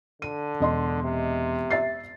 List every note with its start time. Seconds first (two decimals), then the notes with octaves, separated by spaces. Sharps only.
0.22 D3 D#7
0.60 E1 D#5 C6
1.04 C3
1.71 E5 A6 C7